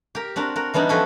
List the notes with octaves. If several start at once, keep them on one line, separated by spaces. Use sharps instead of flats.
G4 A#4
C4 D4 F#4 A#4
F#4 A#4
E3 G3 B3 D4 D#4
F3 B3 C#4 F#4 A4 E5